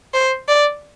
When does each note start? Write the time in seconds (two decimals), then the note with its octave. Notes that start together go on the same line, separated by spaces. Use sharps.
0.14 C5
0.48 D5